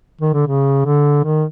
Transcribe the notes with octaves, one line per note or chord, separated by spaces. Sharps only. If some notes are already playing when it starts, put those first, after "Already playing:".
D#3
D3
C#3
D3
D#3